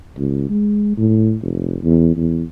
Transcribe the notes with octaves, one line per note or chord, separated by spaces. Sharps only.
C#2
G#3
A2
F1
E2
E2